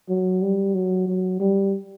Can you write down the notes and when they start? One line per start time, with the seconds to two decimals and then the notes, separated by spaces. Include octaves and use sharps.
0.09 F#3
0.42 G3
0.74 F#3
1.07 F#3
1.40 G3